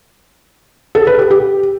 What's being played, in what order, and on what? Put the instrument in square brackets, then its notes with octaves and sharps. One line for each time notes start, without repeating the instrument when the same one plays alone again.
[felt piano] A4
B4
G4
G4